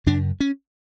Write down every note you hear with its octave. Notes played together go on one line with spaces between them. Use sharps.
F#2 C#3 D4
C#4